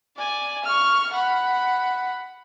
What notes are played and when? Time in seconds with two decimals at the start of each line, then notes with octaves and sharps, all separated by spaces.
0.17 D5 G#5
0.64 C#6 F6
1.13 F#5 B5